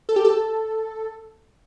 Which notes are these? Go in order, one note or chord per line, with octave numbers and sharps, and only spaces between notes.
A4
G4
A4